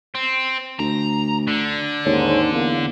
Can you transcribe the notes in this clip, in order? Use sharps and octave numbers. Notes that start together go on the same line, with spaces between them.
C4
D2 A#5
D3
D#2 G#2 C#4 C#5
E2 A#3